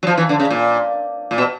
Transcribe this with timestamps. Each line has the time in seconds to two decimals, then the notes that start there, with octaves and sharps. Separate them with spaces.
0.03 F#3
0.07 F3
0.17 E3
0.29 D3
0.40 C#3
0.51 A#2
1.31 A#2
1.38 B2